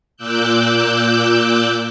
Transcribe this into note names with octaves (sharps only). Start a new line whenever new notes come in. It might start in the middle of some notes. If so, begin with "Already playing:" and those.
A#2 D6 E6 F#6 G6